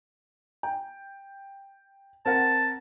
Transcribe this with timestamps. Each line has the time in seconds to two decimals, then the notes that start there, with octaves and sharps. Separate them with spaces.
0.63 G5
2.26 C4 A#4 F#5 A5